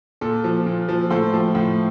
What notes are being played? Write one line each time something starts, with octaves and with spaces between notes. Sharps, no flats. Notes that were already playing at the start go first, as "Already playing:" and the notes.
A#2 A4
F3
A#2
F3
A2 A4 C5
F3
A2